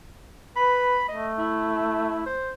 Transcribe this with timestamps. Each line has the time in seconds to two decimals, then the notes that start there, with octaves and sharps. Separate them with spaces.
0.56 B4 B5
1.09 A3 D#5
1.38 E4
2.26 C5